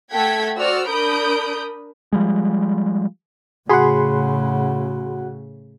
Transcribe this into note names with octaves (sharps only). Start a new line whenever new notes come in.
A3 A4 F#5 G5 G#6 B6
F#4 C5 D5 E6 F6
D4 A#4 B5 D#6 G6 D7
F3 G3 G#3
A2 C#3 F#4 G#4 F#5 B5 C6